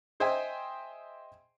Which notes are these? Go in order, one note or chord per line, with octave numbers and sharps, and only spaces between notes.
G#4 C5 D#5 E5 G5 G#5